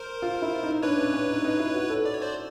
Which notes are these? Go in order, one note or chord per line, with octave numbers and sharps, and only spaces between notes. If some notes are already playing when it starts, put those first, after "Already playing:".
Already playing: A#4 C5
F4
E4
D#4
D4 B4 C#5
C#4
C#4
D#4
D#4
E4
F#4
A4
D5
C#5
C5 D5